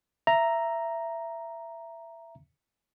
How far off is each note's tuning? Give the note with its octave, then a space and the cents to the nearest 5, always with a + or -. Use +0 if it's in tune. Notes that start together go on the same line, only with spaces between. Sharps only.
E5 +20 A#5 +0